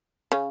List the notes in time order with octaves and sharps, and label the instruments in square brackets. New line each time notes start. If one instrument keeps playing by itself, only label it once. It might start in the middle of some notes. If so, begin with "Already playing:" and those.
[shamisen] C#3 C#4